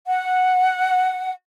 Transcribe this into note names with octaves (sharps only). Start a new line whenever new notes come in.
F#5